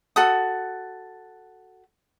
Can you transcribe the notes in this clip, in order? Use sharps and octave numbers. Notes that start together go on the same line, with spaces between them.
F#4 A4 D#6